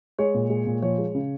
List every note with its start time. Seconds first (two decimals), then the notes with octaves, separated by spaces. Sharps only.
0.19 G#3 C#5
0.34 A#2
0.50 G#3
0.66 A#2
0.82 F3 C#5
0.98 G#3
1.15 C#3